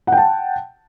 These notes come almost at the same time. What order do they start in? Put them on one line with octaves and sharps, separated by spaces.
F#5 G5 A5